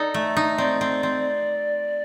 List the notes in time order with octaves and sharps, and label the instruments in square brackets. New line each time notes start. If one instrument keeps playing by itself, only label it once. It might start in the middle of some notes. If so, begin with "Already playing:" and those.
Already playing: [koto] D#4 A4 [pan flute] D5
[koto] A3
D#4
[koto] C4 [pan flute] D5
[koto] C4
C4